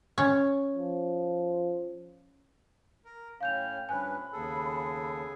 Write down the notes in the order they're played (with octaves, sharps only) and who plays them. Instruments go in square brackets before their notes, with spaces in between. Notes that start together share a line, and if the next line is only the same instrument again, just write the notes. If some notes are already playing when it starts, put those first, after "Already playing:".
[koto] C#4
[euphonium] F3
[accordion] A#4
[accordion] A2 C#4 [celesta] F5 G6 F7 [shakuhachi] G5
[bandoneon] G2 C#4 B4 [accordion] F3 [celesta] G#5 F#6 [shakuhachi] B5
[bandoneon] D#2 A4 [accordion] C#3 B3 G#4